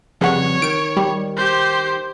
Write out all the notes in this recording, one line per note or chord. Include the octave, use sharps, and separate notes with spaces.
F2 C#3 G3 B3 C#5 F#5
D#3 D7
G3
G4 C5